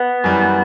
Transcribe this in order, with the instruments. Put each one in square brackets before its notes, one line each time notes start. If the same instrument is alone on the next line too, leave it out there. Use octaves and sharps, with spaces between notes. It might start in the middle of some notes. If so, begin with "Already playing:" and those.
Already playing: [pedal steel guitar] B3
[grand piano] F#2 E3 G3